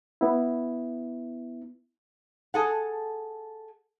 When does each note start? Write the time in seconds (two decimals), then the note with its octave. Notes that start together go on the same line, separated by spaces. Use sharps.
0.21 B3 E4
2.54 G#4 A4 F#5